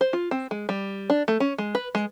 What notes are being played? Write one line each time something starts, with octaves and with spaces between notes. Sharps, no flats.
C5
F4
C4
G#3
G3
D4
A3
C#4
G#3
B4
G#3